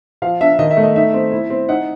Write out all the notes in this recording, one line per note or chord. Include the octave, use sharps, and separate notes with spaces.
F3 F5
D4 E5
D#3 D#5
E5
A3
D#5
D#4 E5
C4
E4
C4
D#4 F#5